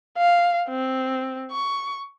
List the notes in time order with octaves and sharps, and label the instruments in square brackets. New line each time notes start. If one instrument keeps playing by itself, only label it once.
[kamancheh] F5
C4
C#6